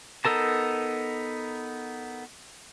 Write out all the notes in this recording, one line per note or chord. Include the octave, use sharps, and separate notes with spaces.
B3 D#4 A4 A#4 A5